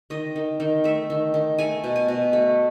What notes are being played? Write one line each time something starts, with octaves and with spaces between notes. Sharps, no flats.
D#3 D#5
D#3
D#3
A3 E5
D#3
D#3
A3 G#5
B2
G#5
B2
A3